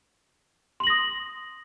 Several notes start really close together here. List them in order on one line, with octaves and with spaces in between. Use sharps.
C6 F#7 A#6 D#6